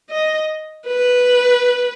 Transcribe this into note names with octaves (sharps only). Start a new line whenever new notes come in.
D#5
B4